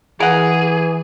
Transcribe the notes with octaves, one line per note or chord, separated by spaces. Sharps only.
E3 G#4 A#4 F#5